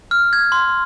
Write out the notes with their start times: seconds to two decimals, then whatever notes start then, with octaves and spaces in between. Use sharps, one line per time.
0.11 F6
0.33 G#6
0.52 C6